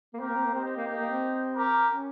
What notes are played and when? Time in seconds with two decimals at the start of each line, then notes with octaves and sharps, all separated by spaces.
0.14 A#3
0.19 C4 G4 A#4
0.28 A#3
0.36 C4
0.45 A#3
0.54 C4 D#4 G4
0.65 C4
0.76 A#3
0.88 A#3
0.99 A#3
1.10 C4
1.55 G4 A#4
1.89 C#4